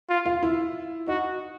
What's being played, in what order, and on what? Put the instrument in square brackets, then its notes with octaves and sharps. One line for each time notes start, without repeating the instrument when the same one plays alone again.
[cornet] F4
[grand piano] F4
E4
[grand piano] D#4 [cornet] F#4